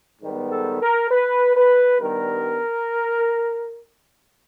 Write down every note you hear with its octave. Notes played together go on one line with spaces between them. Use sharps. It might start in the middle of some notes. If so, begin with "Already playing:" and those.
G#2 D#3 G3 B3
A4
A#4
B4
B4
G2 D#3 G3 B3 A#4